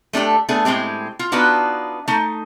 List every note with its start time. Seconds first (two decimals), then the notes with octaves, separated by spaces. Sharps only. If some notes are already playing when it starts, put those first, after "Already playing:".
0.13 A3 D4 G4 A4
0.49 A3 B3 D4 G#4
0.65 A2 G#3 C4 G4
1.19 F4
1.32 B3 D4 D#4 F4 F#4 B4
2.08 A3 D#4